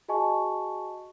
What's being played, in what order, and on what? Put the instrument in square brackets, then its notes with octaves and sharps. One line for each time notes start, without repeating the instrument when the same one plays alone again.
[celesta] F#4 G#4 D#5 G#5 A5 C#6